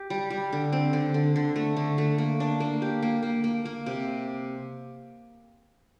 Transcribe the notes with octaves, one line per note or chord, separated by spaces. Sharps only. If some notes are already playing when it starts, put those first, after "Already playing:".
Already playing: G4
G3
G3
D3
C4
D3
D3
D3
A3
D3
A3
A#3
D4
A#3
G4
A#3
A#3
A#3
A#3
C3